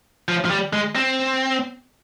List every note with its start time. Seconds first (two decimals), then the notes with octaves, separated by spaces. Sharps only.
0.28 F3
0.45 F3
0.50 G3
0.73 G#3
0.95 C4